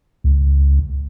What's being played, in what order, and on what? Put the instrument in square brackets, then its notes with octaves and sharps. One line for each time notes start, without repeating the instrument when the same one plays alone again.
[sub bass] C#2